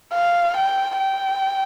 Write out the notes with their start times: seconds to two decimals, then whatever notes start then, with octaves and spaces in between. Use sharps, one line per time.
0.14 F5
0.57 G5
0.99 G5